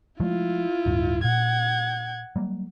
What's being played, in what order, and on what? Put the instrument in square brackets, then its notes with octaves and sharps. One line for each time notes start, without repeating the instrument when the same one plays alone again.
[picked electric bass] F3 G#3 A3 [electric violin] E4 F4
[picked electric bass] D1 G2
[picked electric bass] A#2 [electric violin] F#5 G#6
[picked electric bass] F#3 G3 A#3